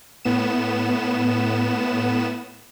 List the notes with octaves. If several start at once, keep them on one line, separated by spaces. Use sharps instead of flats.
A2 B3 E7